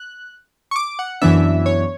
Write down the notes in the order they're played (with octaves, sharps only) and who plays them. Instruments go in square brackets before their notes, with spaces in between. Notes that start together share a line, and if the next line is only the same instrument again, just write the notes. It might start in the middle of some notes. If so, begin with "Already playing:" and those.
Already playing: [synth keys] F#6
C#6
D6
F#5
F#2 E3 B3 D4 E5
C#5